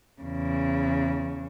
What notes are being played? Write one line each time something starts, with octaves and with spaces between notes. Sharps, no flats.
E2 C#3